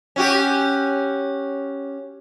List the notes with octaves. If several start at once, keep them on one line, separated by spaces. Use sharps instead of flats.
C#4 F#4 G4